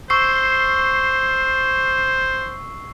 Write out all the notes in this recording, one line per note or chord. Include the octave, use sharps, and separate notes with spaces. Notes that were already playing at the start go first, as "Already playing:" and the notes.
C5 C#6 E6 C7